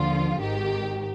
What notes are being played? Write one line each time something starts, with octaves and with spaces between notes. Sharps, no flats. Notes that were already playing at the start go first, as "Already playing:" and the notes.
Already playing: D#2 D3 F3 F4
G#1 G#2 D#3 G4